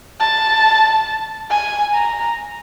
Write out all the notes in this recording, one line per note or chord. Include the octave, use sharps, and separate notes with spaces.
A5
G#5
A#5